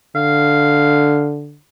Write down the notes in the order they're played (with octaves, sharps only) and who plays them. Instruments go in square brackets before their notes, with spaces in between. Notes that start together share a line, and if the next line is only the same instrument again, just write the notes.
[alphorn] D3 [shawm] F5